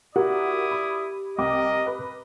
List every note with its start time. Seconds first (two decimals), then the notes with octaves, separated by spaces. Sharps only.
0.16 E4 F#4 G4 A#4 D5 F#5 D#6
0.71 B5
1.38 C2 A#4 D#5 G5 D6
1.86 B4